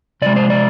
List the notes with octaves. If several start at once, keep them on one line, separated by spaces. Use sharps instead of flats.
C3 F3 G#3 D5
C5
D5